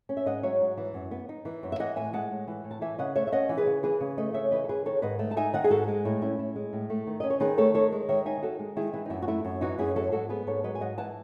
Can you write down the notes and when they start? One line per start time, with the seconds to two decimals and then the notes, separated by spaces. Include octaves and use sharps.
0.09 C#4
0.17 E5
0.26 G#2 D#5 F#5
0.43 F#3 C#5 E5
0.61 G#2
0.77 E3
0.94 F#2
1.11 B3
1.29 D#4
1.45 E3
1.63 F#2
1.72 E5
1.79 E3 D#5 F#5
1.96 A2 E5 G#5
2.13 G#3 F#5 A5
2.31 A2
2.47 E3
2.64 A2
2.71 A5
2.81 E3 E5 G#5
2.98 C#3 D#5 F#5
3.15 A3 C#5 E5
3.27 E5
3.32 C#4 D#5 F#5
3.49 E3
3.58 G#4 B4
3.66 C#3
3.83 E3 G#4 B4
4.00 C#3
4.17 A3 B4 D#5
4.34 C#3 C#5 E5
4.51 E3 B4 D#5
4.64 A4
4.68 C#3 G#4 B4
4.85 D#3 A4 C#5
5.02 G#2 B4 D#5
5.19 A3
5.31 A5
5.37 D#4 E5 G#5
5.53 D#3 D#5 F#5
5.64 G#4
5.70 G#2 F#4 A4
5.88 G#3
6.05 A2 E4
6.22 C#4 E4
6.38 A2 E4
6.56 G#3
6.73 A2
6.90 A3
7.07 D#3
7.20 C#4 D#5
7.30 C#5
7.40 D#3 G#4 B4
7.57 A3 A4 C#5
7.74 D#3 A4 C#5
7.92 G#3
8.09 D#3 C#5 E5
8.25 D#4 E5 G#5
8.42 D#3 F#4 A4
8.59 G#3
8.76 D#3 E4 G#4
8.93 E3 E4
9.06 D#4
9.10 F#2 E4
9.22 F#4
9.28 A3 E4
9.44 F#2
9.61 E3 D#4 F#4
9.79 F#2 E4 G#4
9.96 F#3 F#4 A4
10.12 G#2 F#4 A4
10.29 B3 G#4 B4
10.47 G#2 A4 C#5
10.64 F#3 B4 D#5
10.75 G#5
10.80 G#2 D#5 F#5
10.98 E3 F#5 A5